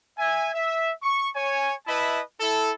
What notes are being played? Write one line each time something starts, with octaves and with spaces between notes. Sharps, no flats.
E5 G#5
E5
C#6
C#5 G#5
E4 B4 D#5 E5 A5 B5
E4 A4